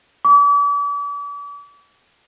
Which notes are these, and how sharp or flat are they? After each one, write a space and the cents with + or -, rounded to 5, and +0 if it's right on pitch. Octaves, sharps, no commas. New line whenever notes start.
D6 -40